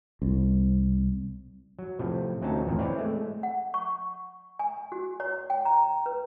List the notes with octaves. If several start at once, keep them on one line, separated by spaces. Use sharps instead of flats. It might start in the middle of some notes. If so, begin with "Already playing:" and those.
C2
F#3
A2 C3 F3
D2 F#3 C4 C#4 D#4 A5
A1 F2 A#2 D#3
C4 E4 B4 C#5 D5
G#3 A3
F#5
C#6
G#5
F#4
C#5
G5
A#5
B4